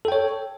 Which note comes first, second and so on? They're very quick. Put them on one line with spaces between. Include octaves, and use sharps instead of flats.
A4 G5 C#5